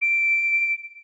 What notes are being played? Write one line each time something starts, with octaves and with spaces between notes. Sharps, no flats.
D7